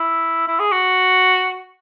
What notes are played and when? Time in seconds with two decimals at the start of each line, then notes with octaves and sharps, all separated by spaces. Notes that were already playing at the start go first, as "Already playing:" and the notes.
Already playing: E4
0.48 E4
0.59 G#4
0.72 F#4